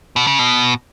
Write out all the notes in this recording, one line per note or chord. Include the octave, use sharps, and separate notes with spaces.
B2
C#3
B2